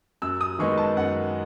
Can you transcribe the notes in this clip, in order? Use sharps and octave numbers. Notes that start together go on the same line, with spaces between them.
F#2 E6
D#6
D#3 G#3 B3 D#4 C#6
A5
F#2 F#5